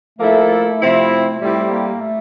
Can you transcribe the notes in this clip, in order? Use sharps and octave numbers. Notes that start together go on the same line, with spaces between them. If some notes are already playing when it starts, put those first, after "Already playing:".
F3 A3 A#3 E4 A4
C3 F3 C4 E4
A2 G3 A3 C4 E4 G4
A#3
A3